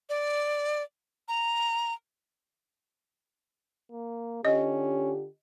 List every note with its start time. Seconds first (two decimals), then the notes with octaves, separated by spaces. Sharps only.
0.09 D5
1.28 A#5
3.91 A#3
4.45 D3 C#4 F4 G4 D#5